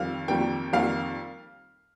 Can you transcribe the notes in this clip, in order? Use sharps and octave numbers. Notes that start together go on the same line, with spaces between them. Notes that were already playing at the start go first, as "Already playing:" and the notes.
Already playing: F2 D#3 G3 F5
F2 D#3 G3 A#3 G5
F2 D#3 G3 A#3 F5